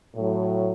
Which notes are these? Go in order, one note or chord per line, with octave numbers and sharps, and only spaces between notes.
A2 F#3